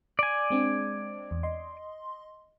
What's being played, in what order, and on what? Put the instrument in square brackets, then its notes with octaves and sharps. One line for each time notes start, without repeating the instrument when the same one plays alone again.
[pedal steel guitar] D5 G#5
[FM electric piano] G#3 C4 D4
E2
D#5 C6